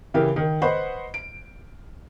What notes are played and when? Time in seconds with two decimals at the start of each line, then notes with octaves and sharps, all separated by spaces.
0.14 C#3 E3 E4 G4 A#4
0.36 D#3
0.62 B4 C5 D#5 F#5 B5 C#6
1.14 D7